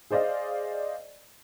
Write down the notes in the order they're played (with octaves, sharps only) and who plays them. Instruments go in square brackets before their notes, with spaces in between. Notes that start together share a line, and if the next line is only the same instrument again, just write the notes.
[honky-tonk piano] G#4 C5 D5 D#5 F5